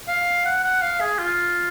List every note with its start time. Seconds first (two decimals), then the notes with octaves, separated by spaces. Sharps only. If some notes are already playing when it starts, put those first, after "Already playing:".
0.08 F5
0.45 F#5
0.64 F#5
0.82 F5
1.00 G#4
1.18 F4